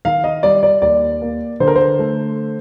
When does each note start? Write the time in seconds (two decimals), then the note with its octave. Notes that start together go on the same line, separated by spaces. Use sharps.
0.05 D#3 F5
0.24 D#5
0.43 G3 D5
0.63 D5
0.82 D#2 D5
1.21 A#3
1.60 D3 C5
1.68 A#4
1.76 C5
1.99 A3